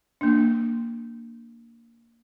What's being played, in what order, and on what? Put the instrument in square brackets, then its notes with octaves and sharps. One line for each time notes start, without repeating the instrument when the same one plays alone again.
[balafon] A#3 D4